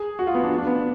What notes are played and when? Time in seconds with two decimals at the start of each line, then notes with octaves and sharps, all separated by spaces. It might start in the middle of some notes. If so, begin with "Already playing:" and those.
Already playing: G#4
0.19 F#4
0.27 F4
0.34 B3
0.44 D4
0.58 D4
0.67 B3
0.75 D4